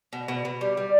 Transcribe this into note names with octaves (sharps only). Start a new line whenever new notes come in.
B2
B2
B2
G3
G3